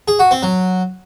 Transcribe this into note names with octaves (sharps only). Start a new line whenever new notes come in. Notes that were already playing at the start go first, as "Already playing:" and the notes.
G#4
F#4
C4
F#3